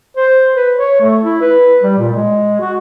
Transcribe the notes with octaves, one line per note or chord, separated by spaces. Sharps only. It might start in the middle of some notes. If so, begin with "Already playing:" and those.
C5
B4
C#5
A3
E4
B4
G3
A#2
G#3
F#4